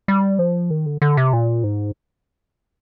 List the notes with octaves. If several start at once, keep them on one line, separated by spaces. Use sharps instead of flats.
G3
F3
D#3
D3
D3
C3
A#2
G#2